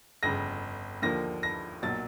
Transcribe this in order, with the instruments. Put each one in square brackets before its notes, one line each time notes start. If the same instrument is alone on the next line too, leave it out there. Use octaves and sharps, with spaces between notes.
[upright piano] G1 F2 C#3 A#6
D#2 D3 F3 A#3 A#6
A#6
B1 A#2 F#3 A6